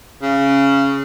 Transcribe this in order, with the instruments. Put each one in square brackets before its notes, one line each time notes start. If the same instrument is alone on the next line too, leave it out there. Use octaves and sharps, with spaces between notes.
[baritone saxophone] C#3